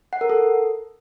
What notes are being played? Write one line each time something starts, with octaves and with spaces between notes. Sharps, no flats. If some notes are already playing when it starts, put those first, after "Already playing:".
F#5
A#4
A4